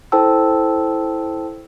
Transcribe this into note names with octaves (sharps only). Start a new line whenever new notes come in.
E4 A4 C5 G5 A5 E6